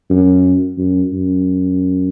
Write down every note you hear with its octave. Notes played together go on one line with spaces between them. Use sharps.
F#2
F#2
F#2